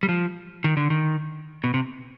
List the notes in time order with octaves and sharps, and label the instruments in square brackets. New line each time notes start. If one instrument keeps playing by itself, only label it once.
[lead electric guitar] G3
F3
D#3
D3
D#3
B2
C3